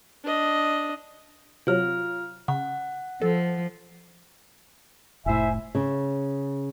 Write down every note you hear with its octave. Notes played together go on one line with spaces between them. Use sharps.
D4 D#5
C3 F#3 F4 F6
C#3 F#5
F3 A4
F1 A2 E4 C5 E5 G#5
C#3